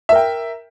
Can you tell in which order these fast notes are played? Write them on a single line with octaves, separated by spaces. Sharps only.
E5 A#4 G5